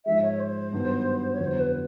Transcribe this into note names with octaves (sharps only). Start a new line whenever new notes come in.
G#2 F3 G#3 E5
C#5
C5
G2 D#3 F#3 B3
C#5
F2 D3 F#3 B3 E4
C5
B4